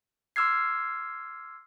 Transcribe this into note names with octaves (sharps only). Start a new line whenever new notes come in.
C6 D6 E6 F6 G#6 C7